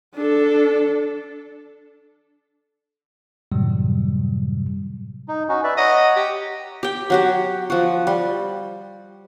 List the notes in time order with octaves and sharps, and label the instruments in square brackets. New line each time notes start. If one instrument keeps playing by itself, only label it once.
[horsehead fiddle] D4 A4
[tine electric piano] F#2 A2 C3 D#3 F#3 G3
[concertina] D#4
C#4 D#4 F#4
B4 D5 E5
[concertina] C#5 F#5 A#5 [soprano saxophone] D#5
[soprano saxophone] G4
[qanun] G4 G5
F#3 F#4 G4
F3 F#4
G3